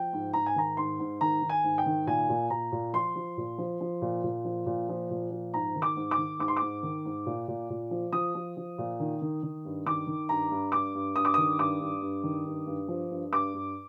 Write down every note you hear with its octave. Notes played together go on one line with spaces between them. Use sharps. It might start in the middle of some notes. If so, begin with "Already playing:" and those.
Already playing: F3 G5
G#2
G#2 A#5
G#5
D#3 A#5
G#2 C6
G#2
D#3 A#5
D#3
G#5
G#2
G5
D#3
A#2 G#5
A#2
A#2 A#5
A#2
F3 C6
F3
A#2
F3
F3
A#2
A#2
F3
A#2
F3
A#2
F3
G#2 A#5
D#3
D6
G#2
D6
D#3
G#2 D6
C6
G#2 D6
D#3
G#2
A#2
A#2
A#2
F3
F3 D#6
F3
F3
A#2
D#3
D#3
D#3
G2
D#3 D6
D#3
G2 A#5
G2
G2 D6
G2
G2 D#6
D6
D#3 D#6
G2 D6
G2
G2
D#3
G2
G2
F3
G2
G2 D6
G2